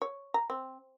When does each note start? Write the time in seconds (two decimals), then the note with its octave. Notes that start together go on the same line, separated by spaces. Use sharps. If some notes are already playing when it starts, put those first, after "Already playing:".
0.02 C#5
0.34 A#5
0.50 C4